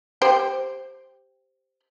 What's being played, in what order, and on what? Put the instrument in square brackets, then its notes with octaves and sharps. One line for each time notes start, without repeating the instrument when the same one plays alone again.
[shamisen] G4 C5 G5